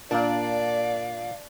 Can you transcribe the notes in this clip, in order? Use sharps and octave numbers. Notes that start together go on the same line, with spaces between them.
A#2 A#3 D4 D5 F5